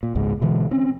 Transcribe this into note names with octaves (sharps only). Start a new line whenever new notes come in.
A#2
G#1 C#2 G#2 G#3
B2 D3 E3 G#3
C4 C#4